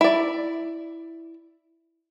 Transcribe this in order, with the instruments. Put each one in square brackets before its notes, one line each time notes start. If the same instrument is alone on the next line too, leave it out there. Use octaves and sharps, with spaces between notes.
[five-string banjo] E4 D5